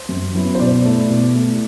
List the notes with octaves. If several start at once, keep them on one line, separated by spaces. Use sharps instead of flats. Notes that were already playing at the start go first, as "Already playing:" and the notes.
Already playing: C5
F#2
F#3 B3 E4
C5
B2 D5
A3 E4
B2
A3 E4